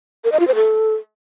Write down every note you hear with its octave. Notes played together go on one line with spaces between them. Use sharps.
A#4
D#5
F4
C5
A4